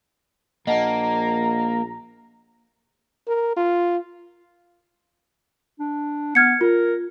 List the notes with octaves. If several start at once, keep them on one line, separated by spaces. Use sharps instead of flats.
A#1 A#3 D#5 F#5 A5 A#5
A#4
F4
D4
B3 F6 G#6 C#7
F4 A#4